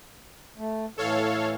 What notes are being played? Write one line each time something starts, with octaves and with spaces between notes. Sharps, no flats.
A3
A2 E3 A4 C#5 F5